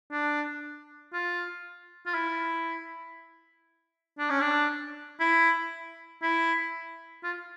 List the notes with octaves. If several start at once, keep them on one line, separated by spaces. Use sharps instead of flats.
D4
F4
F4
E4
D4
C#4
D4
E4
E4
F4